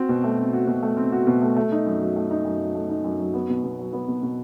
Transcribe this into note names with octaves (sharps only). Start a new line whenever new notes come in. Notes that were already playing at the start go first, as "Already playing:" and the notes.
Already playing: C4 F#4
B2
A3
C4
F#4
B2
A3
C4
F#4
B2
A3
A3
D#4
F#2
F#3
A3
D#4
F#2
F#3
A3
D#4
F#2
F#3
B3
B2
B2
F#3
B3
B2
B2